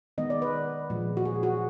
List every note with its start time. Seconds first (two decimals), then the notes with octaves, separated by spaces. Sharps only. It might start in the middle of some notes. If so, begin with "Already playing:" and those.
0.18 D#3 G#3 B3 D#5
0.30 D5
0.42 B4
0.90 A#2 F3 G#3
1.17 F#4
1.25 G#4
1.43 F#4